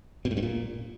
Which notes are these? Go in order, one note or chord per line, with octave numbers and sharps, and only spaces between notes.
B2
A2
G2
A#2